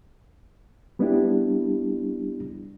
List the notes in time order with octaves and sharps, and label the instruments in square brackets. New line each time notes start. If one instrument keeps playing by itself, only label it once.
[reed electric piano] G3 B3 C4 D4 E4 G4